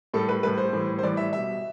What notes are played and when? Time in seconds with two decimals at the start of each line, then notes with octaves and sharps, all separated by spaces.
0.14 A2 G3 A4
0.29 B4
0.43 A2 G3 B4
0.58 C5
0.73 A2 E3 G3
0.99 C5
1.03 A2 E3 G3 D5
1.17 E5
1.33 B2 G3 E5